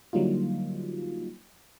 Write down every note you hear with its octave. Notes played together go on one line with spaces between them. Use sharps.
D3 F#3 G3 A#3 D#4 F4